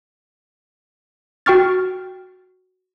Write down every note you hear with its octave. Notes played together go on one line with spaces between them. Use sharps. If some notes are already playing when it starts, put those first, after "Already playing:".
F#4 G5 C#6 F6 A6